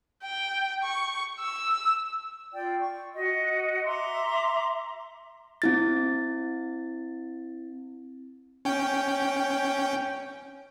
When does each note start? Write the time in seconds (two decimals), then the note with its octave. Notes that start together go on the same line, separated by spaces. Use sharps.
0.23 G5
0.84 C#6
1.39 E6
2.53 F4 D5 G5
2.79 C#6
3.14 F#4 D#5
3.85 E5 A#5 C6 D6
5.62 C4 E4 A6
8.65 C#4 G5